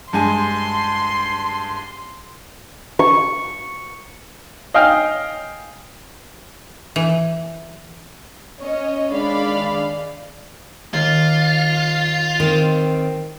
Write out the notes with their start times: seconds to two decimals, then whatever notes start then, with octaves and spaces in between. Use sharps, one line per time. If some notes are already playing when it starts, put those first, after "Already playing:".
0.13 G2 G#3 G#5 C6
2.99 C#6
4.74 D#5 F5 G5 G#5 F6
6.96 E3
8.61 C#4 C#5 D#5
9.10 D#3 G#3 D4 D5 F5 B5
10.94 D#2 F4
12.40 D#3 C4